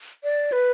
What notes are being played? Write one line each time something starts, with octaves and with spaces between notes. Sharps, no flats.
D5
B4